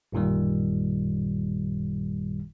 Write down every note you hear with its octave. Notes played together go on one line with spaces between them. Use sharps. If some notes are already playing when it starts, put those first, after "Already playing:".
A1 F#2 A#2 D#3 G3